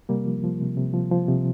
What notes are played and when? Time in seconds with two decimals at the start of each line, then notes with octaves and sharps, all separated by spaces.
0.09 C3 G3 A#3
0.26 F3
0.43 F3
0.61 C3
0.77 C3
0.94 F3
1.12 F3
1.28 C3